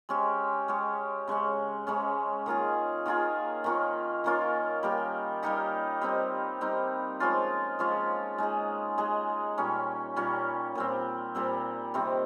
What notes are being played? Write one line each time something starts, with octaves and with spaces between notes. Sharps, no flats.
G#3 C#4 G4
G#3 C#4 G4
C#3 G#3 C#4
C#3 G#3 C#4
D#3 A#3 F4 G#4
D#3 A#3 F4 G#4
D#3 A#3 C#4 F4
D#3 A#3 C#4 F4
G3 A#3 D#4 G4
G3 A#3 D#4 G4
G3 C4 D#4
G3 C4 D#4
F3 G#3 C#4 F4
F3 G#3 C#4 F4
G#3 D#4 G#4
G#3 D#4 G#4
A#2 G3 C#4
A#2 G3 C#4
A#2 G3 C4
A#2 G3 C4
C3 D#3 G3 C4